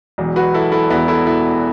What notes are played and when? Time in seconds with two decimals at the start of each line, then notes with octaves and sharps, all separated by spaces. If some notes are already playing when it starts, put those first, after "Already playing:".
0.18 E1 E2 B2 F#3
0.36 F#4 B4
0.54 E4 A4
0.72 E4 A4
0.90 E1 E2 B2 B3 E4
1.08 E4 A4
1.27 E4 A4